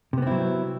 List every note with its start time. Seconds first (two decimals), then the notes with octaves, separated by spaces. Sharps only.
0.13 C3
0.18 B3
0.22 C4
0.27 E4
0.31 F#3